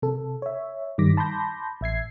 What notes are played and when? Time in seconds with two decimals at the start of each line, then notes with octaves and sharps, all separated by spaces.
0.02 C3 A4
0.42 C#5 E5
0.98 G2 D#3 G3 D6 A#6 B6
1.17 A5 B5 C6 D6 G6 A#6
1.81 A1 E5 G#6 C7